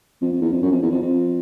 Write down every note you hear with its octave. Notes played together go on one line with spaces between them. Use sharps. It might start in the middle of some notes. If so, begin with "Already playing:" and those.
F2
F2
E2
F2
F#2
F2
E2
F2
F2